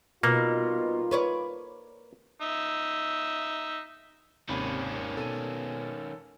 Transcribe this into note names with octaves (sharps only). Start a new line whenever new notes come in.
B2 G3 A#3 D#4 F4
B4 C#5 D5
D#4 E5
G#1 D#2 C3 D#3 C#4 B5
B2 A4 D#7